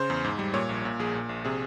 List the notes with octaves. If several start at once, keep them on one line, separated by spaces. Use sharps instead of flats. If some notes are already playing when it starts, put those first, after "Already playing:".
Already playing: C#3 C5
E2
G#2
G3
A#2 C#5
A#1
A#2
A#1 G#4
A#2
A#1
C3 G#4